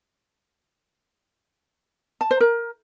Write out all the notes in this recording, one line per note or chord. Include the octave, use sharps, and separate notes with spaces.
A5
C5
A#4